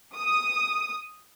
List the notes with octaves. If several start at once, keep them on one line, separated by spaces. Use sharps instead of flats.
D#6